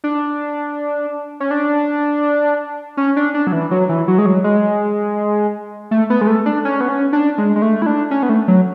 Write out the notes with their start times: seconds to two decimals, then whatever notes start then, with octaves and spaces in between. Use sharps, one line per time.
0.04 D4
1.40 C#4
1.51 D4
2.97 C#4
3.16 D4
3.34 D4
3.47 F#3
3.52 E3
3.71 F#3
3.89 E3
4.08 F#3
4.18 G#3
4.26 F#3
4.44 G#3
5.91 A3
6.10 B3
6.21 G#3
6.27 A3
6.46 D4
6.65 C#4
6.81 B3
6.89 C#4
7.13 D4
7.38 G#3
7.56 G#3
7.62 A3
7.82 E4
7.86 D4
8.11 C#4
8.23 B3
8.29 A3
8.48 F#3